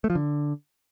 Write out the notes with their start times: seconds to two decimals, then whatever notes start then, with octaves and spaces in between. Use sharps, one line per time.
0.04 A3
0.10 F3
0.15 D3